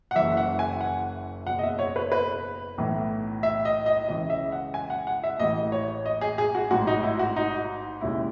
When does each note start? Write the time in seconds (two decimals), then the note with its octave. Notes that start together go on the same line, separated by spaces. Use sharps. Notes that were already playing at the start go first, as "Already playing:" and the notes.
0.11 F#5
0.15 F#1 F#2 E3 E5
0.37 F#5
0.59 G#5
0.81 F#5
1.46 F#1 E2 B2 F#5
1.59 D#5
1.63 E5
1.79 C#5
1.96 B4
2.12 B4
2.78 B1 A2 E3
3.43 E5
3.65 D#5
3.86 D#5
4.09 C#2 C#3 E3 D#5
4.30 E5
4.52 F#5
4.74 G#5
4.90 F#5
5.07 F#5
5.24 E5
5.39 A1 A2 E3 D#5
5.72 C#5
6.06 D#5
6.21 G#4
6.38 G#4
6.55 F#4
6.71 A1 G#2 F#3 F#4
6.87 D#4
7.03 E4
7.19 F#4
7.36 D#4
8.01 E1 D#2 C#3 E4